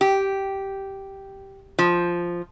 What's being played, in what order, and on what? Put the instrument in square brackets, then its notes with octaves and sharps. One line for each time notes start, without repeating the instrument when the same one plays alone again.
[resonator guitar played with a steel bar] G4
F3